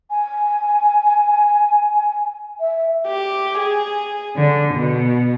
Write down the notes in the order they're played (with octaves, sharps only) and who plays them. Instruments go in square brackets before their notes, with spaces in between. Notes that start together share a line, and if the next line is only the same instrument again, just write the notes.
[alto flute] G#5
E5
[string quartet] G4
G#4
D3
B2